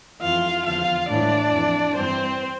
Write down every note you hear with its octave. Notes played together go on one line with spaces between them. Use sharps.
F2 E3 F4 F5
E2 D3 F3 F4 F5
A2 E3 D4 D5
F2 E3
G2 E3 C4 C5